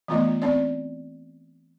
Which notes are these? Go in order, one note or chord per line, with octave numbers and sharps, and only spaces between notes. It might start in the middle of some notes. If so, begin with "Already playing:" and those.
E3 A3 B3 F4 D#5
C4 C#4 D5